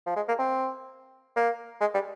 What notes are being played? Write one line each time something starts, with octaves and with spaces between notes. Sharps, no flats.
F3
G#3
A#3
C4
A#3
G#3
G3